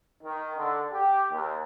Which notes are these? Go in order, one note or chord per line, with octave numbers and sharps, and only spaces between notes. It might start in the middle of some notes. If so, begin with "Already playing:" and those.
D#3
D3
G4
D#2